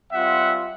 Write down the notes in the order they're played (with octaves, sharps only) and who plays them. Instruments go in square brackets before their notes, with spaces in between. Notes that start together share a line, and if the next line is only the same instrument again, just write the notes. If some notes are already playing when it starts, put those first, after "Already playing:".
[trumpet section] G3 C4 F4 E5 F#5